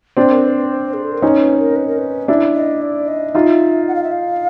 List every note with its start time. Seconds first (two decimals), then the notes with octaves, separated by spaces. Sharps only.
0.17 C4 D4
0.30 A#4
0.43 B4
0.57 B4
0.70 C5
0.94 G#4
1.03 A4
1.12 A#4
1.22 C#4 D#4 B4
1.40 B4
1.59 A#4
1.76 B4
1.87 A#4
1.98 B4
2.28 D4 E4
2.55 D#5
2.82 D5
3.08 D#5
3.35 D#4 F4 E5
3.88 F#5
3.95 F5
4.04 E5
4.12 F5